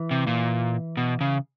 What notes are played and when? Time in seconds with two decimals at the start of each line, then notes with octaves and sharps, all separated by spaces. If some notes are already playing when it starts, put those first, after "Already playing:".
Already playing: E3
0.11 C3
0.27 A#2
0.97 B2
1.21 C#3